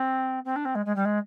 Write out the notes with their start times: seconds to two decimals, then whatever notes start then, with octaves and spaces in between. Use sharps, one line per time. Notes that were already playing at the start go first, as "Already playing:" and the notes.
Already playing: C4
0.45 C4
0.56 D4
0.65 C4
0.75 G#3
0.85 G#3
0.95 G3
1.05 G#3